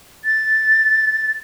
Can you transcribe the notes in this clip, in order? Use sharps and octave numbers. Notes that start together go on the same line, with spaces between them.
A6